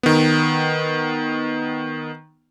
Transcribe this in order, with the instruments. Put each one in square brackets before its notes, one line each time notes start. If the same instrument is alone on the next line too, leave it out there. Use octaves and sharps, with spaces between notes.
[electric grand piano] D#3 B3